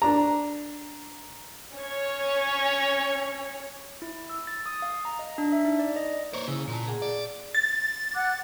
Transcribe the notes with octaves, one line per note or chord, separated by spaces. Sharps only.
D4 A#5
C#4 C#5
E4
E6
A6
D#6
F5
A#5
D#5
D4
E5
D#4
D5
D#5
A#3 C5 C#5
C#3 E4
A#2 A#3 G#5 A5
G#4 F#5
D5
A6
F#5 D6 F#6